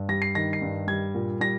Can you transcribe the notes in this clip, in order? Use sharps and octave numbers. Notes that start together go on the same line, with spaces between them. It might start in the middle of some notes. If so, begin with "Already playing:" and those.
Already playing: G2
G3 A#6
C7
D#3 A#6
C7
G2
G3 G#6
A#2
G3 A#6